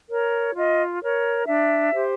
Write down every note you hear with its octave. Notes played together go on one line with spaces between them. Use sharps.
A#4 C#5
F4 D#5
A#4 C#5
D4 E5
G4 C5